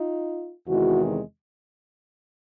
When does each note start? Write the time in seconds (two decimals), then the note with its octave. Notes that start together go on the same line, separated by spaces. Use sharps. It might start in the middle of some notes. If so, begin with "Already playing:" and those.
Already playing: D#4 F4
0.67 E2 C3 D#3 G#3 E4 F#4